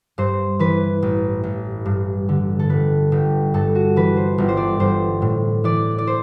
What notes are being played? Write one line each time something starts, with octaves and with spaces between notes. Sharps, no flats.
G2 C5
E3 B4
A1
A1
G2
D3
A4
G1 B4
G1 G4
G2 A4
F#4
E3 B4
C5
G1 D5
C5
D5
G1 C5
A2
E3 D5
D5
C5